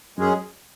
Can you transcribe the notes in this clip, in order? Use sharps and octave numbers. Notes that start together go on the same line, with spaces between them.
F#2 G#3 C#4 G#4